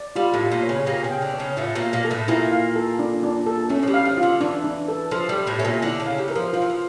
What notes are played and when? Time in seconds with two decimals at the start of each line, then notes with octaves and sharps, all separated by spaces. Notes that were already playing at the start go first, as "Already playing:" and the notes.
Already playing: D5
0.16 G3 F4
0.34 A2 A3
0.40 F4
0.51 A#2 A#3
0.63 C#5
0.69 C#3 C#4
0.86 A#2 A#3 G4
1.04 C#3 C#4
1.10 G5
1.22 D3 D4
1.34 C#5
1.39 C#3 C#4
1.57 A2 A3 F4
1.75 A#2 A#3
1.81 F5
1.93 A#2 A#3
2.05 A4
2.11 A2 A3
2.28 A#2 A#3 E4
2.52 F5
2.76 A4
2.99 D4
3.23 D4
3.46 A4
3.69 A2 A3 C#4
3.83 F3
3.88 G3
3.94 F5
4.05 F3
4.17 F4
4.23 D3
4.41 E3 D4
4.64 D4
4.88 A4
5.11 F3 A4
5.29 G3
5.35 A4
5.47 A2 A3
5.59 C#4 E5
5.65 A#2 A#3
5.82 D3 D4 E4
6.00 C#3 C#4
6.06 F5
6.18 G3
6.28 E3 A#4
6.35 F3
6.53 F3 F4
6.62 E3
6.70 F3